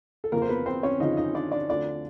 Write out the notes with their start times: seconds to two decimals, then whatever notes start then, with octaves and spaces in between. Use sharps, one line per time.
0.24 A4
0.32 F2 C#3 F3 A#3 A#4
0.42 C5
0.49 B3 B4
0.66 C4 C5
0.83 C#4 C#5
1.00 F2 C#3 F3 D#4 D#5
1.17 D#4 D#5
1.34 D4 D5
1.52 D4 D5
1.69 D2 D3 F3 D4 D5